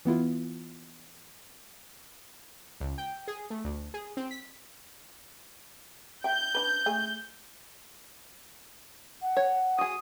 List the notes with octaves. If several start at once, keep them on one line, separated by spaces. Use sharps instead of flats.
E3 B3 E4 F4
C#2
G5
G#4
A3
D2
G#4
C4
B6
E5 G5 G6
D4 B4
A3 G#4
F#5
C#5
F#4 G#4 D#6